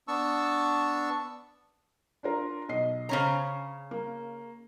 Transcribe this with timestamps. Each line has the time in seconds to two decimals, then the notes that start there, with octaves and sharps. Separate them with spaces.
0.08 B3 D4 A5 C#6 E6
2.23 D4 F4 A#4
2.69 B1 D#5 C7
3.09 C#3 C#4 C5 C#5 A#5
3.91 A#3